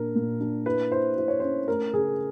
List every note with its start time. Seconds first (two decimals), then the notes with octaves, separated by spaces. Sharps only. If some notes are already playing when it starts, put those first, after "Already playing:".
Already playing: A#2 D4 A#4
0.16 A#2
0.41 D4
0.66 E4 B4
0.92 E4 C5
1.17 E4 C5
1.28 C#5
1.40 C#4 C5
1.68 A3 A#4
1.93 C#3 G#4